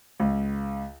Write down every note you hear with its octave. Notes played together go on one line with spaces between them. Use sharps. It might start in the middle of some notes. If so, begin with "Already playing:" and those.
C#2